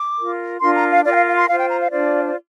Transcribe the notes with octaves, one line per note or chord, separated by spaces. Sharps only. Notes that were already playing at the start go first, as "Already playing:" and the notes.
Already playing: D6
F4 A#4
D4 F4 A#4 C6
A#5
F5
F4 A#4 D5
G5
F5
F5
C6
F4 C5 F5
G5
A#5
F5
D4 F4 C5 D5
D5